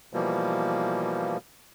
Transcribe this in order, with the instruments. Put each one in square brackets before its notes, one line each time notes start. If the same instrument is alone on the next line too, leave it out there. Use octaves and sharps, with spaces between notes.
[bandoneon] B2 E3 F3 G3 A#3